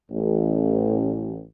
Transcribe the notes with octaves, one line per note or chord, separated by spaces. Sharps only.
A1